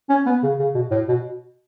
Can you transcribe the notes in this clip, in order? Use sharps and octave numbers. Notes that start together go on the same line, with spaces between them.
C#4
B3
C#3
C#3
B2
A2
B2